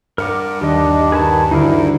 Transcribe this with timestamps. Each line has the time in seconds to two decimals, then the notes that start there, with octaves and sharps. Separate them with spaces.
0.18 G2 A#4 F#5 D6
0.61 D#2 D4 G4 D#5
1.12 D#3 G#4 B4 A5
1.51 D2 D#4 E4 G#4 A#4